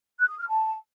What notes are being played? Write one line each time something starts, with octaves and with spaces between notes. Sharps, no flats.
F#6
D#6
F6
A5